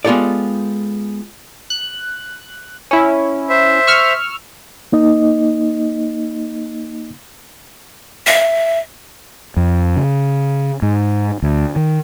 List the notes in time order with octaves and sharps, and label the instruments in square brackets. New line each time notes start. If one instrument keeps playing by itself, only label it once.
[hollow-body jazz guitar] G#3 B3 F4 G4 A4 D5
[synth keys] F#6
C#4 E4
[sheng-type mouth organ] C5 E5
[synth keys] C#6 E6 F6
[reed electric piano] A#3 D#4 D#5
[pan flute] E5
[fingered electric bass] F2
C#3
G#2
D2
D#3